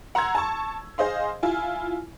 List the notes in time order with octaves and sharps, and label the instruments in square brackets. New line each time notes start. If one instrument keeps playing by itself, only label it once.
[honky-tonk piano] F#5 A#5 C6 E6 G#6
A5 C#6
G#4 C5 D#5 F5 C6
E4 F4 G#5